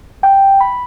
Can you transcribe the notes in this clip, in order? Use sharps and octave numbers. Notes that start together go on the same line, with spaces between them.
G5
B5